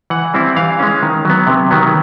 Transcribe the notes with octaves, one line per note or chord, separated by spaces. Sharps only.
E3 F#5
G3 C4 E4
E3 F5
G#3 C#4
D#3
F#3 B3
C3
D#3 F#3 B3